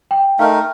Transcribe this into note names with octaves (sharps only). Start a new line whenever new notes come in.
G5
A3 D#4 A#4 F5